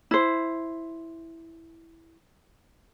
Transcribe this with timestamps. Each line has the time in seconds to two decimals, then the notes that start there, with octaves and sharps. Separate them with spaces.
0.11 E4 C5